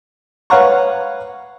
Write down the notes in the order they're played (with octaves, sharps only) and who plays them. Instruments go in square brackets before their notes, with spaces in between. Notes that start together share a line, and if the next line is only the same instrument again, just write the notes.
[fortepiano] B4 C#5 F5 F#5 A#5 C#6